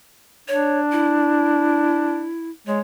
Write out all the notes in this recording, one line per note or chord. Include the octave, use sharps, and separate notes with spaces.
D4 C#5
E4
G#3 C#5